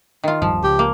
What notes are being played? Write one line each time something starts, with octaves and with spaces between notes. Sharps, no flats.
D#3 F4
D1 G2 F3
C#2 G4
A#3